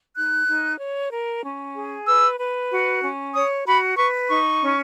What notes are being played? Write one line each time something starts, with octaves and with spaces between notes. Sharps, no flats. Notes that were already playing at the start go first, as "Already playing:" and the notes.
D#4 F#6
D#4
C#5
A#4
C#4
G#4
B4 E6
B4
F#4
C#4
C#5 D#6
F#4 B5
B4 C#6
D#4 C#6
C#4